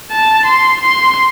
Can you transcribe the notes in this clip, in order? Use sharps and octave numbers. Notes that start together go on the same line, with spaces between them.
A5
C6
C6